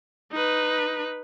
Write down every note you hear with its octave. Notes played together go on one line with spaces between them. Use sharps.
D#4 B4